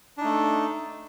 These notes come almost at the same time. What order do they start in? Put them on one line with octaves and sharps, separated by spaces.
D4 D#4 A3